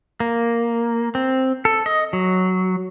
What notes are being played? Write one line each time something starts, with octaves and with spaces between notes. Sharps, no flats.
A#3
C4
A4
D#5
F#3